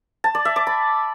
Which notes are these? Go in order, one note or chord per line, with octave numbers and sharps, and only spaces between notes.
A5
D5
E5
D6
B5